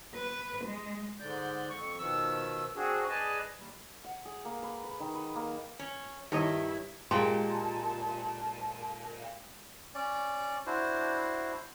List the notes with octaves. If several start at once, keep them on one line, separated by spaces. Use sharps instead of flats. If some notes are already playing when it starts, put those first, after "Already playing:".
B4
G#3
G#2 D3 D5 G6
F2 C#6
B2 D#3 F3 E6
C4 D4 F#4 G#4
G#4 B4 D5 D#5 G#5 A5
D#2 G3
F#5
G#4
A#3
B4
B4
D#3
B4
A#3
C#4
G2 D#3 E4 C#5 D#5
A#2 G#3 G4 F5 A5 C6
C#4 D5
D4 E4 F#4 C5